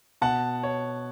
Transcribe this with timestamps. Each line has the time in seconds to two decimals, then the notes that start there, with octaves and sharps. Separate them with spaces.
0.22 B2 F#5 A5
0.63 C#5